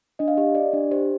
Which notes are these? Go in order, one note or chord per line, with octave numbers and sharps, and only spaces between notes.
D4 D#5
F5
G4 D#5
G4 D5
D4
G4 C5